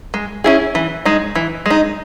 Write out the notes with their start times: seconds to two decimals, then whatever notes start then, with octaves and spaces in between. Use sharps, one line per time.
0.14 G#3
0.44 C#4 E4 G#4
0.75 E3
1.05 G#3 D#4
1.35 E3
1.66 G#3 D#4